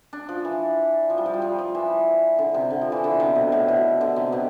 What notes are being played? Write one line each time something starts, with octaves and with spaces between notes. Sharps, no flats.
D4
F3
E3
F3
G3
F3
G3
F3
F3
E3
D3
C3
D3
F3
E3
D3
B2
C3
B2
A2
B2
D3
C3
B2